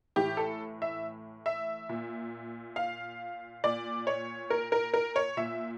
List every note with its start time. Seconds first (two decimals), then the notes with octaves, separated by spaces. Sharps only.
0.16 A2 E3 G4
0.37 A4
0.82 E5
1.46 E5
1.89 A#2
2.76 F5
3.64 A#2 D5
4.07 C#5
4.50 A#4
4.72 A#4
4.94 A#4
5.16 C#5
5.37 A#2 E5